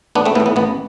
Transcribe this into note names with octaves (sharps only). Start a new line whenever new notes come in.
A1 B3 D4
A3 C4
A2 E3 B3
B3
A1 B3